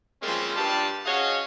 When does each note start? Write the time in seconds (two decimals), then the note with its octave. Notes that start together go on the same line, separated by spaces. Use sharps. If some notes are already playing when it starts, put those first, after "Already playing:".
0.23 F3 G3 G#3 A#3 C4 C#4
0.56 G2 G3 F4 G4 D5 A5
1.05 C#4 F#4 G#4 C#5 D#5 F5